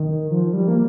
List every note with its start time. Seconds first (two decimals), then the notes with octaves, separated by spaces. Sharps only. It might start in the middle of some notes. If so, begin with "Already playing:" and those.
Already playing: D#3
0.31 F3
0.53 G3
0.68 A#3